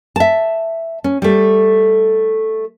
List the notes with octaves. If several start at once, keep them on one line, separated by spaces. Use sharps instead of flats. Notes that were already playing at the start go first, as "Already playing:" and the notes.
E5 A5
C#4
G3 A3